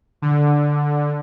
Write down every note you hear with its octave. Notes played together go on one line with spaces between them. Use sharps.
D3